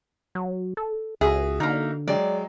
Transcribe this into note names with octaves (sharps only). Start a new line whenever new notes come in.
F#3
A4
C#2 F#4 G#4 E5
D3 A#3 D#4
F#3 G#3 D5 G5